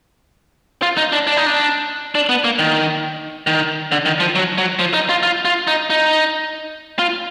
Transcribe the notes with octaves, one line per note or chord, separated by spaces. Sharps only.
F4
D#4
D4
D4
D#4
D4
D4
B3
A#3
D#3
D#3
D3
D#3
F3
F#3
F#3
F3
D#4
F4
F4
F4
D#4
D#4
F4